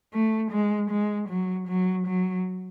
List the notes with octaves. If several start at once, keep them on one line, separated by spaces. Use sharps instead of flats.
A3
G#3
G#3
F#3
F#3
F#3